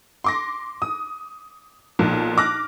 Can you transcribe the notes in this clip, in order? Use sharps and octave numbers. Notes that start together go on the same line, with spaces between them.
C6 D6 A#6
D#6
B1 A#2 F3
D6 F6 F#6 A#6